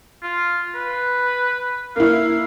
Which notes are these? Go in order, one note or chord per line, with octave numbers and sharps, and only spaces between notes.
F4
B4
A#3 E4 F5